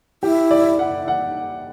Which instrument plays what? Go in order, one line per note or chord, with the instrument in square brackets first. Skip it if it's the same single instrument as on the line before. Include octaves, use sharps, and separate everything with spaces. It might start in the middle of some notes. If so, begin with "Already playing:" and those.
[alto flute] E4 [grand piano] G4
[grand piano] D5
F#5
F#5